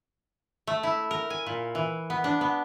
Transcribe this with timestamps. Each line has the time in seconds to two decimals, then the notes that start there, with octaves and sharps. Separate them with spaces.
0.67 A3
0.83 E4
1.11 A#4
1.30 G#5
1.46 A#2
1.75 E3
2.10 B3
2.24 D4
2.41 B3